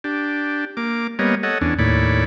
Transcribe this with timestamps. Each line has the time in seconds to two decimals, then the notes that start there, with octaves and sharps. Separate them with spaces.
0.04 D4 G4
0.77 A#3 D6
1.19 G3 A#3 B3 C#5 D#5
1.43 A4 C#5 D#5 F#5
1.61 E2 C#4 D4
1.79 D#2 A2 C#5 D5 B5